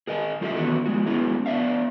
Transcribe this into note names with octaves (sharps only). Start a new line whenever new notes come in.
G#4 A#4 D#5 G5 G#5
F#3 F4 G4 A4 D#5 E5
D#3 E3 F#3 B3 F#4 A4
F3 G#3 F#4
F#3 G#3 B3 C#4 E4 G#4
B3 D4 D5 E5 F5